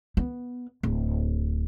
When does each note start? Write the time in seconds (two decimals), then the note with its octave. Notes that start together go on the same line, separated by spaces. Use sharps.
0.17 B3
0.83 D1